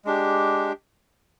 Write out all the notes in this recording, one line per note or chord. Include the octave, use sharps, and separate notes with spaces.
G#3 D4 G4